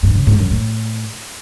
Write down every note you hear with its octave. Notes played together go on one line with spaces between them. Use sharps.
G2
C#3
G#2
F#2
A2